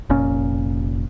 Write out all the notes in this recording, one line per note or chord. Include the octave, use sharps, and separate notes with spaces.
F1 A#2 C#4